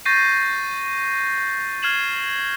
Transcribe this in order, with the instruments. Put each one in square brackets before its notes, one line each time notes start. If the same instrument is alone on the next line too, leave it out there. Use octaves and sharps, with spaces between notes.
[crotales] C#6 G6 A6 A#6 C7 D#7
F6 G#6 C7 E7 F#7